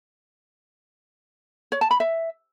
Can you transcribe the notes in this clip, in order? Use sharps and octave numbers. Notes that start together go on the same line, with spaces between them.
C#5
A5
B5
E5